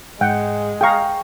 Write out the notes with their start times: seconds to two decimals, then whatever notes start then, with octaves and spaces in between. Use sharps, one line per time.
0.21 G#2 G#3 F#5 G5
0.81 G#4 F5 G5 A#5 C#6